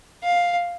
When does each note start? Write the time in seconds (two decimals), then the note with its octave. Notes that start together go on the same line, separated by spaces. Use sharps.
0.24 F5